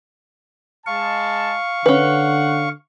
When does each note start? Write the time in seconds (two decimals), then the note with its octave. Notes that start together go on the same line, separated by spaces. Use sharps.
0.87 G#3 F5 A5 C#6
1.86 D3 C#4 B4 F#5